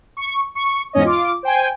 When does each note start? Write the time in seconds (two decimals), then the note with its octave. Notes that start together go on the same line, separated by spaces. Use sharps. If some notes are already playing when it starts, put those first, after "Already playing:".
0.17 C#6
0.55 C#6
0.93 E2 G#2 C#4 C#5 D#5
1.04 F4 D6
1.43 C5 G5 G#5